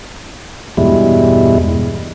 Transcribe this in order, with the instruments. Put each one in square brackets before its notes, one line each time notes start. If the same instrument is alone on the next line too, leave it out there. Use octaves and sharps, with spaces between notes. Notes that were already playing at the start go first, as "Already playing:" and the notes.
[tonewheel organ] E2 G2 B2 G3 G#3 E4